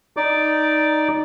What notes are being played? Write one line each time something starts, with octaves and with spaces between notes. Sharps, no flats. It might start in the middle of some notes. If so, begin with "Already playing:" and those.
D#4 D5 D6